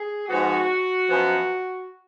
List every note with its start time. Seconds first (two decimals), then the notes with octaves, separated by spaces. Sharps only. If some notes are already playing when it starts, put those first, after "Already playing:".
Already playing: G#4
0.29 G#2 F3 B3 F#4
1.08 F#2 F3 B3